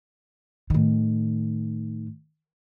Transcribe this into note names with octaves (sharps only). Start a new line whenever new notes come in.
A2 D#3